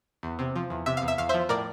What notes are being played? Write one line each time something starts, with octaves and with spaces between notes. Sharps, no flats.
E2
C3
F3
E2
C3 E5
E2 F5
E5
E2 F5
F3 C5 E5
A2 A#4 D5